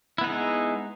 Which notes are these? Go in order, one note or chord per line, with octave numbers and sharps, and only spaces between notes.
G#3 B3 D#4 E4